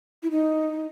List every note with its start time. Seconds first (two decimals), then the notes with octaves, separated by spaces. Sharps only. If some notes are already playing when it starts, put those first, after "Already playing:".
0.23 E4
0.31 D#4